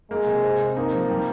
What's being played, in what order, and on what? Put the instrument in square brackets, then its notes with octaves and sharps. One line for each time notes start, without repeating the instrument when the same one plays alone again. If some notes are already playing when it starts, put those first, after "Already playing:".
[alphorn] G#3 [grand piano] A#3
[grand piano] C3
C4
C4
[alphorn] A#3 [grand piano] D#4
[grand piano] F3
G3